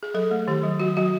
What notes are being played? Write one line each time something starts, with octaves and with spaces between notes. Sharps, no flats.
G#4
F#3 A4
A3
D#3 G4
F#3
F#3 F#4
F#3 F#4